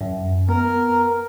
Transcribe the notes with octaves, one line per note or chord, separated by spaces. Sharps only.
F#2
B3 A#4